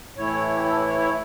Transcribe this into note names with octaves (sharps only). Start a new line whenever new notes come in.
A2 E3 A3 E4 C#5
G4
A4
C#5
C#5